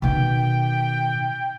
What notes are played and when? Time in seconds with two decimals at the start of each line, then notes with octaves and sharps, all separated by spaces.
0.02 B2 D#3 G5